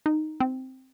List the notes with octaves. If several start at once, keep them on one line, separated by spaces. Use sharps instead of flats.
D#4
C4